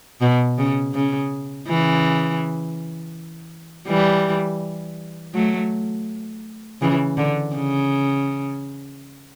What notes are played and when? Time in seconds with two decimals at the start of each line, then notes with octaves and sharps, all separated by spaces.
0.21 B2
0.58 C#3
0.95 C#3
1.68 C#3 E3
3.88 E3 G3
5.34 F#3 A3
6.81 C#3 E3
7.17 D3
7.55 C#3